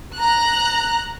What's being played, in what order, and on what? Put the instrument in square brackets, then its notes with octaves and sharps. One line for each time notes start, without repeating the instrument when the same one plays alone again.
[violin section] A#5 F#6